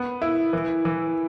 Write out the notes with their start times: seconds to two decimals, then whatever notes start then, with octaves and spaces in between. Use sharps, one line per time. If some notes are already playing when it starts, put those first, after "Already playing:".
Already playing: B3
0.22 E4
0.53 E3
0.85 E3